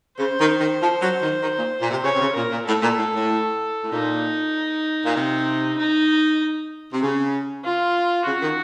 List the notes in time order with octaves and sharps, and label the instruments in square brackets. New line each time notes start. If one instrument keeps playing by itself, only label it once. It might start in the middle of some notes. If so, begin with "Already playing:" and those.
[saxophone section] C#3 [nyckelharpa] C5
[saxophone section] D#3
D#3
F3
F#3
D#3
D#3
A#2
A#2
C3
[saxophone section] C#3 [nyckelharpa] C#5
[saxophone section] C3
C#3
[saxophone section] A#2 [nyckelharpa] A#4
[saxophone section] A#2
[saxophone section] A2 [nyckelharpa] A4
[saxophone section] A#2
A2
A2
A2
[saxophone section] A#2 [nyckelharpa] D#4
[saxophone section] A#2
C3
[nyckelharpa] D#4
[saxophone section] C3
C#3
[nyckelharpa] F4
[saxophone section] C#3 [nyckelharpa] F#4
[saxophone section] D#3